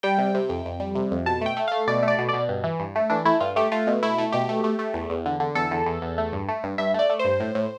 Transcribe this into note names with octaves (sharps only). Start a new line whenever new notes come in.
G3 G5
C3
C3
F2
F2
G3
C3
F2
B2 A5
A3 G5
A3
A3 F5
B2 D5
A3
D5
B2
B2 D5
G2
E3
G2
A3
E3 D4
A3 E4
G2 F4
A3 G4
A3 F4
B2
A3 E4
A3
B2 G4
A3
A3
A3
E2
E2
D3
D3
E2 A4
E2
E2
E2
A3
G2
A3
G2
G2 E5
A3 D5
A3
C5
G2
A2
A2